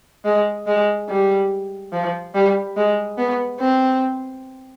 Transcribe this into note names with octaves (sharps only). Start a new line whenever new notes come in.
G#3
G#3
G3
F3
G3
G#3
B3
C4